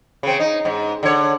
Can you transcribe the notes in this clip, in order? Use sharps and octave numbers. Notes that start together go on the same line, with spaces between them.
C#3 C4
D#4
G#2
D3 C#5